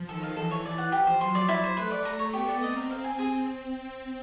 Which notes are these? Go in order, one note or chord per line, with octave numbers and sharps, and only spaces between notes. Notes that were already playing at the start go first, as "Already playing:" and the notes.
Already playing: F3
D#3 A4
F5
E3 A4
C#5
D5
F#5
F3 G4
C5
F#3 C6
D5
E4
C5
A3 B4
D5
A3 A#5
C#5
B3 G4
D5
C4 D#5
A#4
C4 F5
G#5
G#4